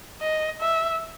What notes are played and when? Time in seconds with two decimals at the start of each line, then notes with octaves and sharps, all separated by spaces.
0.21 D#5
0.61 E5